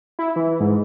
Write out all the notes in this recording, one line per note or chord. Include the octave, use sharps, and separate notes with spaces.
E4
E3
G#2